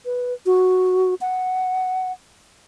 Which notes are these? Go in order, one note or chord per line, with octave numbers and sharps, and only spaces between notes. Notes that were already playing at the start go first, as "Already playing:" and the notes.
B4
F#4
F#5